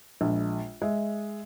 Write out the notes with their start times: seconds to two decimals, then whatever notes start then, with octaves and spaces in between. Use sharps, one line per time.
0.21 A#1 G#3
0.82 G#3 E5